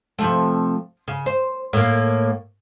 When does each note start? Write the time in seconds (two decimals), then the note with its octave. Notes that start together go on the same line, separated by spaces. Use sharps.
0.18 C3 F3 A3
1.08 C#3
1.26 C5
1.73 A2 A#3